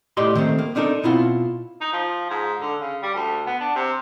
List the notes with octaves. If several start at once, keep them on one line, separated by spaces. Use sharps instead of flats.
A2 G4 A4 D5 D#5 C6
D#3 A3 A#3 C4
A#3
C4 D4 D#4 A4 A#4
B2 C4 E4 F4 F#5
D#4
F3
G#2
D3
C#3
G3
D2
B3
D4
C3